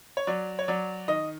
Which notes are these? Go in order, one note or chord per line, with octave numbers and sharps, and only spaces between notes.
C#5
F#3 D5
C#5
F#3 D5
D#3 D#5